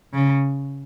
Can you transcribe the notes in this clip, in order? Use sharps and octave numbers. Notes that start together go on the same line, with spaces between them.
C#3